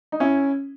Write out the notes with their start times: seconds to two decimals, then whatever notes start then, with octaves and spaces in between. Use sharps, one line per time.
0.12 D#4
0.20 C#4 E4